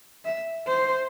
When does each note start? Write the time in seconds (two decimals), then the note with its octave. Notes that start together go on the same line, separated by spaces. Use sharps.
0.25 E5
0.67 C5